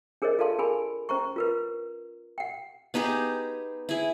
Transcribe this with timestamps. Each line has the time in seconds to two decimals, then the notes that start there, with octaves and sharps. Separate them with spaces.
0.22 D4 G#4 A#4 C5 C#5 D#5
0.39 F4 A4 D5 F5 A5 C6
0.58 D4 G#4 A#4 G#5 B5
1.09 C#4 C5 A#5 C#6
1.36 F4 A#4 B4
2.38 F#5 G5
2.94 B3 D#4 G4 G#4
3.89 E4 G#4